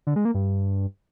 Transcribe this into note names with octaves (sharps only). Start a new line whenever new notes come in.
D3
G#3
A#3
G2